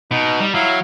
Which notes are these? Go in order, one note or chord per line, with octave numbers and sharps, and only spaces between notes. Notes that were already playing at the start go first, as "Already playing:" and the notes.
B2 D#4
G3
F#3 E4 F5